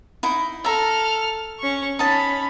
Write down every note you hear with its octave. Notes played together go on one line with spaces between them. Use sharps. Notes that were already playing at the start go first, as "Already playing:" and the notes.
D#4 E4
A4 E5 A#5 F6
C#4 C#6
C#4 D#4 A5 B5